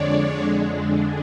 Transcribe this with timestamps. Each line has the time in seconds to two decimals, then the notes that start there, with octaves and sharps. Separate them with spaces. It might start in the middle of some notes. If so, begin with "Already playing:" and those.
Already playing: F2 D3 G#3 D4 C#5 D5
0.39 F2 D3 G#3 D4